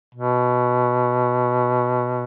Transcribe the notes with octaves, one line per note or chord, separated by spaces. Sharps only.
B2